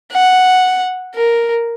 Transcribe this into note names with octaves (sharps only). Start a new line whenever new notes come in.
F#5
A#4